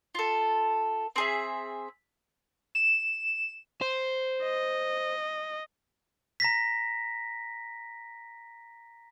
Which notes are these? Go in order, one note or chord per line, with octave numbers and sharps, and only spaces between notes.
F4 A4
C4 G#4 E5
E7
C5
D#5
A#5 A#6 B6